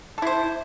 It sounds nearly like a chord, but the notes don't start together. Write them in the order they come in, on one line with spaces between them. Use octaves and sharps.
A4 E4 C5